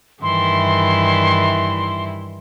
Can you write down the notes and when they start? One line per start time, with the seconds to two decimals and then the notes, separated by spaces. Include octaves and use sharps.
0.22 G2 D#3 E3 E4 C6